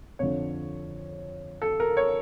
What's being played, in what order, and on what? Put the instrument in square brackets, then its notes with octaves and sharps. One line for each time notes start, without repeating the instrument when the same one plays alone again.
[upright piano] F2 D3 F3 C#5
A4
A#4
C#5